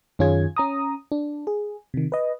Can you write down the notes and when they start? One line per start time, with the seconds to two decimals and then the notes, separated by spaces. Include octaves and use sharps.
0.19 F#2 D#3 C#4 F4 G#4 G#6
0.57 C#4 A#5 D#6
1.12 D4
1.47 G#4
1.94 C3 D#3
2.12 B4 D#5